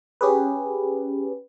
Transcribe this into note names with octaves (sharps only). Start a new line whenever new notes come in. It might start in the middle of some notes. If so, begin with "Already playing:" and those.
C#4 G4 G#4 B4